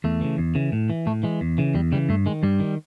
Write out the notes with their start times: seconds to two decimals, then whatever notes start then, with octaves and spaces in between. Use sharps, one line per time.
0.04 E2 A3
0.21 C#3 E3
0.38 E2
0.55 C#3 E3
0.72 A2
0.90 E3
1.06 A2 A3
1.23 E3 G#3
1.41 E2
1.58 C#3 E3
1.74 E2 G3
1.92 C#3 E3 G3
2.09 G2 A3
2.26 D#3 G#3
2.43 G2 G3
2.60 D#3